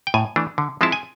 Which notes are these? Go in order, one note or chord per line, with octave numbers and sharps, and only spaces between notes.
G5
A2 G#5
E3 A3 D4
D3
F3 G#3 C4 E4 A5
G#5